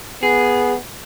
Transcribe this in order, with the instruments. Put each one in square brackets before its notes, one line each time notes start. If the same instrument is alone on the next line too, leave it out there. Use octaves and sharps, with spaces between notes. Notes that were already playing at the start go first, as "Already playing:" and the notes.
[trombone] B3 [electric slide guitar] G#4